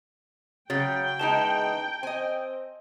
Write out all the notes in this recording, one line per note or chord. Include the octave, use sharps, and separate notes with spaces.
C#3 F#3 G5 A6
E2 C#3 G#3 D#4 A5
C4 D#5 G#5